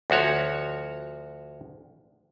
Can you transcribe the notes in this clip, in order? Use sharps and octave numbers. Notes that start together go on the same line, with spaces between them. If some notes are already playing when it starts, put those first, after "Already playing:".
D2 F3 F#4 C#5